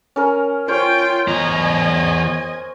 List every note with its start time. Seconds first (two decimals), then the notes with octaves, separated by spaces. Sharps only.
0.16 C#4 A#4
0.68 F4 C5 C#5 G5
1.28 E2 D#5 G#5 A#5